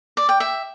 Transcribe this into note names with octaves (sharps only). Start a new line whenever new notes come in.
D5
G5
E5